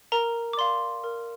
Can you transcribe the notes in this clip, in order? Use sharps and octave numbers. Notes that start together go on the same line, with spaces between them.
A#4 A#5
D6
D5 F5 C6
A#4